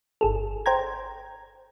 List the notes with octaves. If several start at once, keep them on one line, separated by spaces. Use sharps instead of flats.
G1 G#4 A4
C5 G5 A#5 G#6